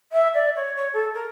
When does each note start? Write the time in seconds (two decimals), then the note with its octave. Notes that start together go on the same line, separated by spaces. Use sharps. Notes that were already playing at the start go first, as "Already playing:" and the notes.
0.12 E5
0.34 D5
0.56 C#5
0.76 C#5
0.93 A4
1.14 A#4